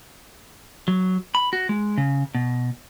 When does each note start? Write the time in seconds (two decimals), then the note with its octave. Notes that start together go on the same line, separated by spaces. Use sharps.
0.88 F#3
1.35 B5
1.53 F#4
1.69 G#3
1.98 C#3
2.35 B2